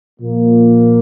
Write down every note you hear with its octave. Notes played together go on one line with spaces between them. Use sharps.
A#2 F3 A#3